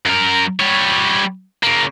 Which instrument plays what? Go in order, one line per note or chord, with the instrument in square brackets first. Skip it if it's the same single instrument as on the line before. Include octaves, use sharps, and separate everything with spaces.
[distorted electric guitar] F#2 A#4
G3 C#5
C#3 A#3